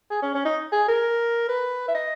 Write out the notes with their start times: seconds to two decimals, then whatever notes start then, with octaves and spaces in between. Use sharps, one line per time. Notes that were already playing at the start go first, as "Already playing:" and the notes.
0.11 G#4
0.22 C#4
0.35 C#4
0.45 D#4
0.72 G#4
0.88 A#4
1.49 B4
1.88 E5
1.95 D#5